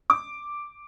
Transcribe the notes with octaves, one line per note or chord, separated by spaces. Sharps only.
D6